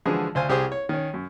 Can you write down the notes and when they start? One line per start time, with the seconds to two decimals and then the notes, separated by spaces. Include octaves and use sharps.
0.06 D3 E3 F3 G#3 F#4 G#4
0.35 D2 C5 F5 G#5
0.49 C2 G4 G#4 C5 D#6
0.72 C#5
0.89 D#3 C#4
1.14 F#2